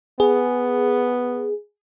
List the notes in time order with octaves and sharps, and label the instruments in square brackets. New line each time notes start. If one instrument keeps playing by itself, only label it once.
[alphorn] B3 [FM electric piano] G#4